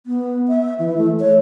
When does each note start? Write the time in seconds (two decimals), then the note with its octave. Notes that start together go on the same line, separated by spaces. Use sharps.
0.06 B3
0.48 E5
0.79 E3
0.97 A3
1.20 C#5